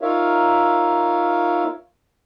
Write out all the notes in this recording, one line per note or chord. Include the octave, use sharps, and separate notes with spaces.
D#4 F4 A#4 C#5 E5 F5